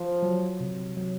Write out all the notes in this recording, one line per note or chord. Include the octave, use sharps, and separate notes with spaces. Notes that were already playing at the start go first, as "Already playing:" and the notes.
Already playing: F3
F#3
C3
F#3